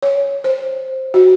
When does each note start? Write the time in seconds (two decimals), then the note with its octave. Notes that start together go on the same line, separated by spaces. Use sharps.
0.03 C#5
0.44 C5
1.14 F#4